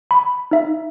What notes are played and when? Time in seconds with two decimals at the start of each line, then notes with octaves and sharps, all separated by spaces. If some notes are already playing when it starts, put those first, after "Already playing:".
0.11 B5
0.51 D#4 E5